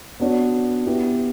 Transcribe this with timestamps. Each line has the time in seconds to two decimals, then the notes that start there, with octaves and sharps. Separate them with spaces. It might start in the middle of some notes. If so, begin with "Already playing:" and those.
0.20 B3 D4 F#4 C#5
0.86 B3 E4 G4